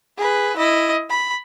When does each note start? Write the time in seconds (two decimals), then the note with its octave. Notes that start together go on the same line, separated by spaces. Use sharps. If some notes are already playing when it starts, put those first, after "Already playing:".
0.18 G#4 B4
0.56 E4 D#5
1.09 B5